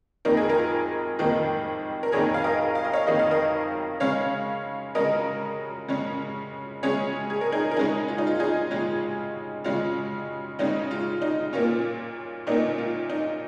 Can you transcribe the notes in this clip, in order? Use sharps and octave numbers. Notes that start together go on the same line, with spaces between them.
F2 D#3 A#3 D#4 A#4
G#4
F4 A#4
F2 D#3 A#3 D#4
A#4
F2 D#3 A#3 D#4 G#4 C#5
F5
A#4 D#5
F5
D#5
C#5 F5
F2 D#3 A#3 D#4 D#5
F5
A#4 D#5
C#3 G#3 C#4 C#5 F5
C#3 G#3 C#4 A#4 D#5
C#3 G#3 C#4
C#3 G#3 C#4 G#4 C#5
G#4
A#4
D#4 G#4
A#4
C#3 G#3 C#4 D#4 G#4
F4
D#4
F4
D#4 G#4
C#3 G#3 C#4 F4
C#3 G#3 C#4 F4
C#3 G#3 C#4 D#4
F4
D#4
A#2 A#3 C#4 F4
A#2 A#3 C#4 D#4
F4
D#4